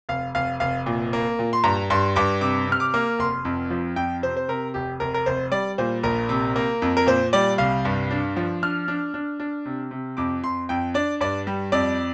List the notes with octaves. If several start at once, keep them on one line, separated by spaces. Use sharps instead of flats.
F1 F5
F1 F5
F1 F5
A#2
A#3
A#2
C6
G2 A#5
G2 C6
G2 D6
C3 D6
C3
F6
D6
A#3
F1 C6
F2
F3
F2 G5
C3 C5
C5
C3 A#4
F1 G4
F1 A#4
A#4
F1 C5
G3 D5
A#2 C5
A#1 A#4
C3
A#3
F2
A#4
A#2 C5
G3 D5
C2 F5
G2
D4
F3
D4 F6
D4
D4
D4
C3
C3
F2 D6
F2 C6
F2 G5
D4 D5
G2 D5
G3
F2 D5